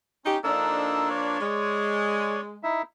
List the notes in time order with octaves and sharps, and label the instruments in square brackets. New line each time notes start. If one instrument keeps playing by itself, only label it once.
[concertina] C#4 [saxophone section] D#4 G4
[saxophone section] F3 A#3 D4 [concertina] D#4 A4 E6
[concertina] C#5 D5
[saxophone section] G#3
[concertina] D#4 E4 E5